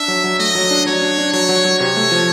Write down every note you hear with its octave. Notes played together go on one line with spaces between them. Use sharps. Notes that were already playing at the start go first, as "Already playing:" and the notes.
Already playing: D4 E5
F#3
F#3
A3 D#5
F#3
D4
F#3 C#5
D4
D4
F#3 C#5
F#3
F#3
C3 C#5
A3
F3